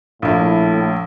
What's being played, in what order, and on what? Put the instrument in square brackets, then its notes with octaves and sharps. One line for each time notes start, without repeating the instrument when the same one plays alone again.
[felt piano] A#1 E4 [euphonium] A2